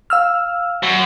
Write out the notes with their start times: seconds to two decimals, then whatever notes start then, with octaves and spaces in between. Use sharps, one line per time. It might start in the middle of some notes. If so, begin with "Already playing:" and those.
0.10 F5 E6 F6
0.83 F#2